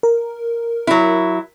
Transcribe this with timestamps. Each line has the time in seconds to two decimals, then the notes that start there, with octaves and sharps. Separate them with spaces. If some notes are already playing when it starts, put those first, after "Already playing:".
0.03 A#4
0.87 F#3 E4